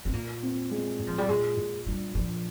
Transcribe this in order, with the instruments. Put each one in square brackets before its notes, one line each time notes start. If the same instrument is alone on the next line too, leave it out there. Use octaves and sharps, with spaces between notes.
[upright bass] C4
[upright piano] A#2 [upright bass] A#3
[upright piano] C4
G#3
A#2
[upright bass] F3
G3
[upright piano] A#2 [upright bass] G#3
[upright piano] A#2
[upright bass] G3 [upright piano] D4
[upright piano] A#2 [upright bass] F3